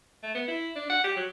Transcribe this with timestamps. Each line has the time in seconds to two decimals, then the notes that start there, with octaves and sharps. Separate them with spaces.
0.23 A3
0.35 B3
0.48 E4
0.76 D4
0.90 F#5
1.04 G4
1.16 F#3